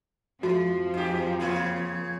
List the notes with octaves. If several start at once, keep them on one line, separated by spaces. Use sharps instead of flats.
F2 F3 G#3 F#4
G#2 G4
C#3 A#3 F4